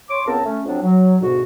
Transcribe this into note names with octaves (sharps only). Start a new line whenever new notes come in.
C#5 C6 D6
C#2 C#3 B3 C4 A#4 A5
A3 C#4
F2 F#3 C4 D4
F#3
D2 G#2 B2 B3 F#4